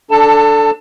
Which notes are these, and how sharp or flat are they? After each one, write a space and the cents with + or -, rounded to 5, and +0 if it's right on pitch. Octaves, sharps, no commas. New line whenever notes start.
D4 +0 A4 +0 A5 +25